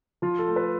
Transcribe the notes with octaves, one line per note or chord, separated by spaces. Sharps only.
F3 F4
A4
A3
B4